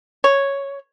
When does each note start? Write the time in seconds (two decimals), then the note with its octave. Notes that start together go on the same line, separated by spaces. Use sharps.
0.24 C#5